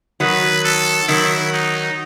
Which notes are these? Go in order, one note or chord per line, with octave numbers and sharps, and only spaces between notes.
D#3 F#3 B4
A4
D#3 F#3 E4
D#4